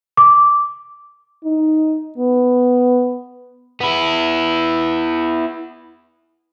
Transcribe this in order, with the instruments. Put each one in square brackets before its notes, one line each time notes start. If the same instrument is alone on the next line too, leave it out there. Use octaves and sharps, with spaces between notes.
[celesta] D6
[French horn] D#4
B3
[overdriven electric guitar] B3 E4